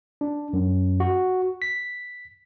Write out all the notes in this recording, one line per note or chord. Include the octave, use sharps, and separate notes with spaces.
D4
F#2
F#4
B6